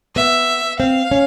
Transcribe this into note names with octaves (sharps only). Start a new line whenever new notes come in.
B3 E5
C4 F5
C#4